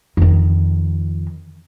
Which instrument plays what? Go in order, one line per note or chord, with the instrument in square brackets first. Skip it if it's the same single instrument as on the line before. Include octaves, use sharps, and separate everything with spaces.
[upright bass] F2 D#3